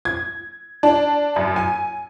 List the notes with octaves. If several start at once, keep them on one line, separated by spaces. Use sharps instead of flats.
G#6
D4
F#2
G#5